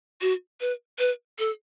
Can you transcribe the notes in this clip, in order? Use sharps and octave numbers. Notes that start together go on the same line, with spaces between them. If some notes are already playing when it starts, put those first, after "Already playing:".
F#4
B4
B4
A4